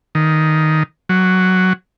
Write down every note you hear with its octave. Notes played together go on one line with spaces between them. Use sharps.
D#3
F#3